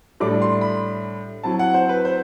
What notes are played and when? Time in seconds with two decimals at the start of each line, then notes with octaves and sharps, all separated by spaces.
0.20 A2 G3 D4 D6
0.42 C6
0.61 B5
1.43 F#3 C4 E4 A5
1.59 F#5
1.74 C5
1.89 B4
2.05 C5